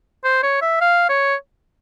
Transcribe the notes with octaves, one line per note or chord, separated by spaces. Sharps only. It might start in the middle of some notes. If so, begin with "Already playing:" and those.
C5
C#5
E5
F5
C#5